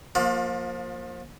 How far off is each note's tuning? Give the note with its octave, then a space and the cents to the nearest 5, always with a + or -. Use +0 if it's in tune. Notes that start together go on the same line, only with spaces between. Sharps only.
F3 +25 A#3 +0 F4 +45